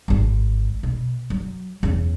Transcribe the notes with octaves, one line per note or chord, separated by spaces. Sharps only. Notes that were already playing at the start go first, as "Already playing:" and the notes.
G#1 D3
B2
F#3
E2 C#4